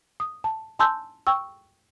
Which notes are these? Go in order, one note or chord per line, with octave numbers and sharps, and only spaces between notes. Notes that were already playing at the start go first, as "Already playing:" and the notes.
D#6
A5
G#5 A5 C6 E6 G6
G5 C#6 E6